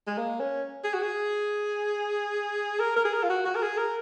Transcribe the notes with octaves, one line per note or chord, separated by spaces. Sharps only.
G#3
A#3
C#4
G#4
F#4
G#4
A#4
A#4
G#4
A#4
F4
F#4
F#4
A#4
G#4
A#4